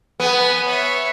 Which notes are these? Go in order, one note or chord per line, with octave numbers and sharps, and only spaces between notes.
B3 B4 G#5
C#5 E5